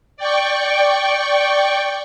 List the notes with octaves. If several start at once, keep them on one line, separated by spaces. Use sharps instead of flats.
D5 G5 C#6